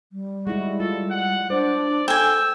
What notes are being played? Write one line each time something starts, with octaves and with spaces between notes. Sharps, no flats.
G3
G#3 E4 F#4
F4 A4
F#5
D4 C5 D5
A4 G5 G#5 E6